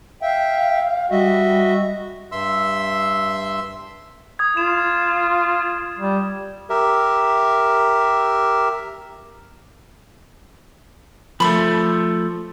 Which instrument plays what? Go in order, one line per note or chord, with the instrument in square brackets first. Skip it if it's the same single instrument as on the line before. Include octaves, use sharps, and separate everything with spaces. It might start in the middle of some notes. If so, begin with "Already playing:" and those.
[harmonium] E5 G5 [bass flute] F5
[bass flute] G3 [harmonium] F#4 D#5 E5
[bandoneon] G2 E5 C6 E6
[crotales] D#6 G#6
[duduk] F4 [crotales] E7
[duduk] G3
[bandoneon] G4 A#4 E5
[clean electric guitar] F3 A3 [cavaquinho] B5 C6